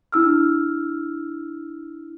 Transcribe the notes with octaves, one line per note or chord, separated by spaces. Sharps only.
D4 E4 E6 F6